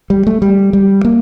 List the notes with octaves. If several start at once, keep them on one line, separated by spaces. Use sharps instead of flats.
G3
A3
G3
G3
A#3